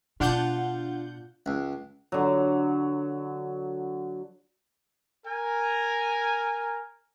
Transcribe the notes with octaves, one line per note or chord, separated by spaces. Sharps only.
B2 D4 F4 F#5 G6
C#2
D3 F#3
A#4 G#5